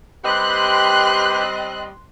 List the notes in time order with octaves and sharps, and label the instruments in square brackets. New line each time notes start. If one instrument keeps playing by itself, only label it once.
[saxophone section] G3 C4 D#5 [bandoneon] G4 B4 G5 [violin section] C6 F#6